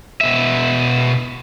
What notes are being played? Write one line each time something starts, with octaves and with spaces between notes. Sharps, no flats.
B2 E5